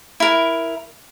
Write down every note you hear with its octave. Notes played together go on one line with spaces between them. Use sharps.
E4 A#4